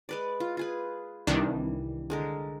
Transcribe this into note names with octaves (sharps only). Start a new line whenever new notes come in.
G#3 B4 D5
F4
F4 G#4 B4
C2 D#3 E3 G3 D4
D3 G#3 A#4